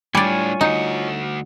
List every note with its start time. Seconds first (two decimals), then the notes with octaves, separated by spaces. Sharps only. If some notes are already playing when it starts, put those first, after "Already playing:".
0.15 A2 G3 D4 F4 C#5 D5 G#5
0.61 D2 D#4 F#4